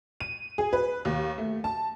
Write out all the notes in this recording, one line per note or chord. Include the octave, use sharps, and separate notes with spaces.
D#7
G#4
B4
D#2
A3
A5